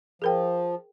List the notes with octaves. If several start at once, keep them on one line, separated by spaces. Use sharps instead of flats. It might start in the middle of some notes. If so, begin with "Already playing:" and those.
F3 G#4 A#4 G5